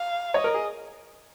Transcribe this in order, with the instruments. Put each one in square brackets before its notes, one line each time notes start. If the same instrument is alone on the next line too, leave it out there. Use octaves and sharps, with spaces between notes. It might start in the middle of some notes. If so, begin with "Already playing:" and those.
Already playing: [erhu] F5
[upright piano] C#5 [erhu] D#5
[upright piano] A#4
G#4